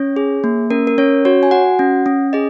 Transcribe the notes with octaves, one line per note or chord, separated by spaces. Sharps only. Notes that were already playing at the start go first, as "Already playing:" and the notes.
Already playing: C#4 C#5
G#4
A#3
C#4 A#4
A#4
C#4 C#5
F#4 C#5
G#5
F#4 F#5
C#4
C#4
G#4 D#5